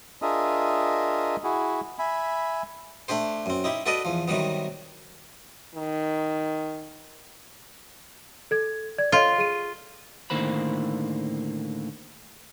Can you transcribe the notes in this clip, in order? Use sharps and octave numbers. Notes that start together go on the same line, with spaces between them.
D4 F4 G#4 A#4 D#5 E5
E4 F#4 G#4
E5 G#5 B5
A3 D4 G4 C5
F#2 C4
D#4 E4 G4
F#4 A4 B4 D5 D#5
E2 F3
C3 D#3 F#3 G3 B3
D#3
A4 G#6
D5 G#6
F4 A4 C#5 D#5
G#4 D#7
A2 D3 D#3 A#3 C5 B5